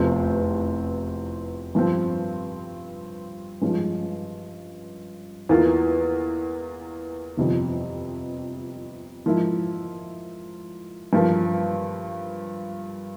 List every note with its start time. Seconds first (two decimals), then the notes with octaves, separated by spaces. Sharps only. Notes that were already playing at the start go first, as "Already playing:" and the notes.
Already playing: F1 E2 C3 F3 C4
1.75 G2 F3 C4
3.62 G2 F3 G#3 C#4
5.49 E2 E3 A#3 F4
7.37 G1 F2 C3 F3
9.26 G#2 F3 A#3 E4
11.13 G2 F3 A#3